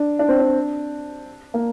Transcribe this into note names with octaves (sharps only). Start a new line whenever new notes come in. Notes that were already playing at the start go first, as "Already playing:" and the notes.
Already playing: D4
D4
C4
D4
A#3